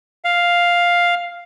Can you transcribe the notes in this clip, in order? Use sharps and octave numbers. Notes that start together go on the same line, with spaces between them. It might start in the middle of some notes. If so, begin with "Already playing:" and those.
F5